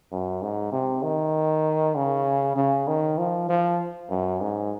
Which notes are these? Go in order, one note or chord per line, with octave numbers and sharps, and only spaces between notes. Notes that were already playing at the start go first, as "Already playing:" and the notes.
F#2
G#2
C3
D#3
C#3
C#3
D#3
F3
F3
F#2
G#2